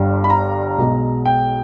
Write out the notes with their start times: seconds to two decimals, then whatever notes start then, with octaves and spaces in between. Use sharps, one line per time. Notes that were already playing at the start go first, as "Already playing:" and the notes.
Already playing: G1 G2 G3
0.24 B5
0.30 A#5
0.78 B1 B2 G#3
1.25 G5